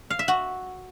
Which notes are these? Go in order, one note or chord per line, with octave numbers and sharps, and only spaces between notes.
F5
E5
F#4